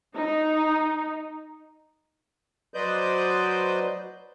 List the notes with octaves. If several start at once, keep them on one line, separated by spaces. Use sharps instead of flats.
D#4
F#3 B4 C5 D5 D#5 G6